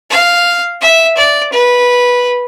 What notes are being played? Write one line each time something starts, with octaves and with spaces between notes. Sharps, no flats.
F5
E5
D5
B4